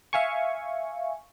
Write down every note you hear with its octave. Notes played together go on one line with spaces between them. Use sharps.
E5 F5 G#5 C#6